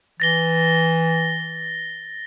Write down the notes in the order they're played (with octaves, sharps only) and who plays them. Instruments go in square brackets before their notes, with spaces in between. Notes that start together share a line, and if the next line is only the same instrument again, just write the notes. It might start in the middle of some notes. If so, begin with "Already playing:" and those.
[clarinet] E3 [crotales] A6 A#6 G7